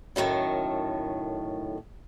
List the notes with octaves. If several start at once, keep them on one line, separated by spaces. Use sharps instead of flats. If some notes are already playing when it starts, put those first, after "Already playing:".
F#2 A2 D#3 A3